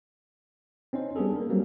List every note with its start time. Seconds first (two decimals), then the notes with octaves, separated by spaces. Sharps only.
0.93 C4 C#4 D#4 C5
1.16 G3 B3 D4 G#4 A4
1.36 A#3 A#4
1.50 F#3 G3 A#3 C4